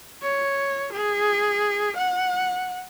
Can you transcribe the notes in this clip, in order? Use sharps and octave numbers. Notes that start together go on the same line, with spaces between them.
C#5
G#4
F#5